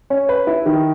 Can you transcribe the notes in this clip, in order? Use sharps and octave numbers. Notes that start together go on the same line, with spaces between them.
C#4
B4
E4
D#3